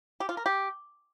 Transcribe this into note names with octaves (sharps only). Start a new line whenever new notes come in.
G4
F4
A#4
G4